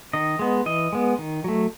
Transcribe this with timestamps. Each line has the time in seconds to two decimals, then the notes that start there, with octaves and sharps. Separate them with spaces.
0.13 D#3 D#5
0.39 G#3 B3
0.66 E3 D#5
0.93 G#3 B3
1.18 D#3
1.44 F#3 A3